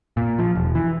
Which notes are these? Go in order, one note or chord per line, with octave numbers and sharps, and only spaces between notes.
A#2
F3
E1
E3